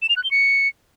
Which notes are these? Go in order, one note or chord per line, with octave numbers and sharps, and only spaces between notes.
E7
F7
F#6
G7
C#7